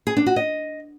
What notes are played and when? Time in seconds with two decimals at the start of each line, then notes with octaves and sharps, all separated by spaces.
0.07 G#4
0.17 D4
0.26 F#4
0.36 D#5